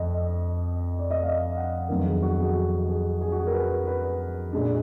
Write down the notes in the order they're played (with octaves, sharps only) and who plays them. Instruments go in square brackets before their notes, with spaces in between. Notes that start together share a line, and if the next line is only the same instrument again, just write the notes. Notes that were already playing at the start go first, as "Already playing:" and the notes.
Already playing: [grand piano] F2 D#5
D5
D#5
F5
F#5
F2 D#3 F#3 B3 D4 A#4
G#4
F#4
G#4
F#4
G#4
G#4
F#4
G#4
A#4
B4
B4
A#2 G#3 D4